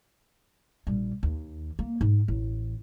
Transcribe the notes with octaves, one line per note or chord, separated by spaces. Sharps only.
A#1 G3
D#2
A#3
G#2
A1